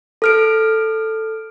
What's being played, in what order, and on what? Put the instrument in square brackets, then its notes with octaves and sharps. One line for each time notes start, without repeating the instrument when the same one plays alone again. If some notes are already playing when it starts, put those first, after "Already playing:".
[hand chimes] A4 F6 D7